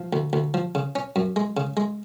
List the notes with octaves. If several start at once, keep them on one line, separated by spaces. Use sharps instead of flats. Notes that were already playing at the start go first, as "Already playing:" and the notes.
Already playing: F3
D2
D2
F3
C#3
C#4
F#2
G#3
C#3
G#3